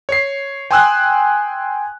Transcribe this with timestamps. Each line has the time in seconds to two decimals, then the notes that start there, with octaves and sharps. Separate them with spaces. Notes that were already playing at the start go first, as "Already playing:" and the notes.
0.09 C#5 C7
0.71 G5 G#5 C6 D#6 E6 F#6